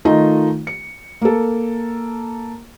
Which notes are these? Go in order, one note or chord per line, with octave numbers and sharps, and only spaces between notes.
D#3 A3 D#4 F4 D#5
C#7
A#3 A4